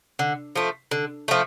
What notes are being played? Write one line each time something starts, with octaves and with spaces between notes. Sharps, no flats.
D3
F3 A3
D3
F3 A3